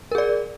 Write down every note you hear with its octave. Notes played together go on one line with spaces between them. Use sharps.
G#4 A#4 D5